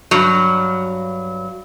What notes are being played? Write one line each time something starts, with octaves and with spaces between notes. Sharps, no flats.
G2 F#3